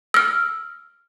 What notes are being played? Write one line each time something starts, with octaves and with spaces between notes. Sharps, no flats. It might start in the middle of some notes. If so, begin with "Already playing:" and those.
E6 F6